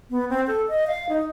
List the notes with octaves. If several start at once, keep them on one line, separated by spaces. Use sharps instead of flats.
B3
C4
A4
D#5
F5
D#4